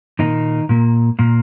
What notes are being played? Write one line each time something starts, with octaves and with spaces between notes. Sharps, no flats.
A#2 D#3 A#3 D#4
A#2 A#3
A#2 A#3